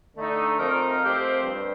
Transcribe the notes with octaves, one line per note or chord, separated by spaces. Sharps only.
D3 A3 D#4
F3 C4 D#4 A#4
F3 A3 C4 G4 C5
G2